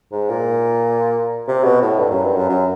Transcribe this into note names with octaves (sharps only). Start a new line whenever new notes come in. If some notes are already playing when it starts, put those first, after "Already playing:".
G#2
A#2
C3
B2
A2
G2
F#2
G2
F#2
F#2